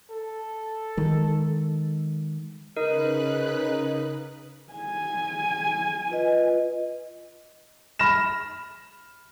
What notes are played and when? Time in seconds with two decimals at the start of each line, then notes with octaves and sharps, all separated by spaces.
0.10 A4
0.97 D#3 G#3
2.77 C#3 D#4 A#4 B4 F#6
4.73 G#5
6.10 F4 B4 D#5
7.99 B5 F6 A#6 E7